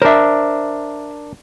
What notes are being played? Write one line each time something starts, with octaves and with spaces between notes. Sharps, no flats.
D4 A#4 C5 E5